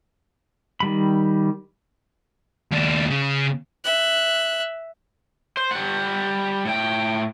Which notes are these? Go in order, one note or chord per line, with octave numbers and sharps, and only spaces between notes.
D#3 G3 B5
D#2 D4
C#3
E5 F#6
C5
G3 F#5
A2 G5